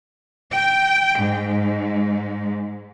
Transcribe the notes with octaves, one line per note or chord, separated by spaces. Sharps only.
G5
G#2